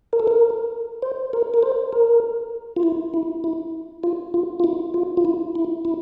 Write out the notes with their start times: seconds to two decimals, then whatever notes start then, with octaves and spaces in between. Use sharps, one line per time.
0.13 A#4
0.19 A4
0.27 A#4
1.02 C5
1.33 A#4
1.54 A#4
1.63 C5
1.93 A#4
2.76 F4
2.83 E4
3.14 E4
3.44 E4
4.04 F4
4.34 F4
4.60 F4
4.64 E4
4.94 F4
5.17 F4
5.25 E4
5.55 E4
5.85 E4